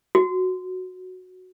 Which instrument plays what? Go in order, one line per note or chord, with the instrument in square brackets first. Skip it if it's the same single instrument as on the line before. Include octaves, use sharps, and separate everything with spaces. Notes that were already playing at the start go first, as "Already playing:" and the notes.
[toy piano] F#4